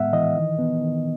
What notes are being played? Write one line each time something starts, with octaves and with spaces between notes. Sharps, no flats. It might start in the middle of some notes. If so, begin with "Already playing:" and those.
Already playing: A2 G#3 B3 E5 F#5
E3 D#5
D#3
B3
D#3